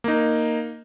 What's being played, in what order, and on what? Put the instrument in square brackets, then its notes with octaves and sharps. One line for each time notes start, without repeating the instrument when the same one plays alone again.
[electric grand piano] A#3 D#4